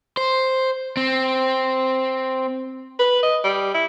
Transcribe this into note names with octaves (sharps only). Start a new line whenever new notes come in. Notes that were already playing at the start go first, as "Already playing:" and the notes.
C5
C4
B4
D#5
G3
E4